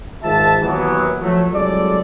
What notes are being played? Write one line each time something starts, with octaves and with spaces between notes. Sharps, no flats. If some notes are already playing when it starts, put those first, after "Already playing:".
G#2 D#3 F4 E5 A5
D#2 E3 F#3 B3
F3 F#3 A3
C2 F#3 G#3 A4 D5